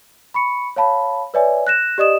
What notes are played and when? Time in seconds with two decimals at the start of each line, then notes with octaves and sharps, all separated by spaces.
0.34 B5 C#6 C#7
0.76 C#5 F5 A5 B5
1.34 B4 C#5 D5 E5 G#5
1.67 F#6 A#6 E7
1.98 G4 D5 D#5 D#6 E7